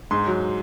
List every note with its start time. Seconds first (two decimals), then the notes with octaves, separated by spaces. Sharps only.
0.11 G#2 C6
0.27 F#3